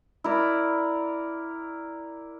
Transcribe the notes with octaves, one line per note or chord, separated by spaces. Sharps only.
E4 A#4 D5